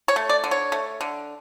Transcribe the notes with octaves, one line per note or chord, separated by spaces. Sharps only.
C#5
A3
D5
D3
C#5
A3
D3